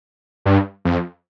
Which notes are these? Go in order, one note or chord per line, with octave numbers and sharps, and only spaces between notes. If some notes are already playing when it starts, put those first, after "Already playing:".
G2
F2